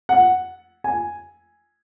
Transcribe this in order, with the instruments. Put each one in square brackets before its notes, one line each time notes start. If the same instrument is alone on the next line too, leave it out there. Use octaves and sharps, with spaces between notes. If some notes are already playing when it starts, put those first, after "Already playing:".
[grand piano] F#5
G#5